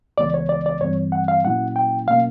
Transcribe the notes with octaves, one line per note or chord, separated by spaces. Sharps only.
C#2 C#3 E3 G#3 B3 D5
C#5
D5
D5
G2 E3 G3 C4 C#5
F#5
F5
A#2 F#3 A#3 C#4 E4 F#5
G5
B2 F#3 A#3 C#4 F5